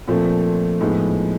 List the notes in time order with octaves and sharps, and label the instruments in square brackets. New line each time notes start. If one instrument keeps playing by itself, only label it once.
[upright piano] A#2 F3 A3 C4
A2 F3 G#3 B3 D#4